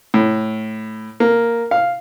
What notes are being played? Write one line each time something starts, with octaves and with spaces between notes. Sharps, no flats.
A2
A#3
F5